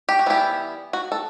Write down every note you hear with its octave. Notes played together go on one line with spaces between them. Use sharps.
G4
F#4
E3 G3 B3 E4 G4
F#4
A4